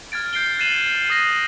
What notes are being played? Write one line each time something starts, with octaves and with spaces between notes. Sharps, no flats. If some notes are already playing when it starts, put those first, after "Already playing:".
F6 G#6 A6 D7
G6 C7 D7 G7
F#6 A6 C7 D#7 E7 F#7
D#6 A#6 D#7